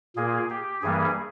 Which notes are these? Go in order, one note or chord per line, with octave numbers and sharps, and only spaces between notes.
A#2 A#3 G#4
G4
G2 E3 G3 A#3 G#4